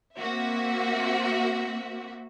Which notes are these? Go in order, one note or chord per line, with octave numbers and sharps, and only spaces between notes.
A#3 C4 F#4 E5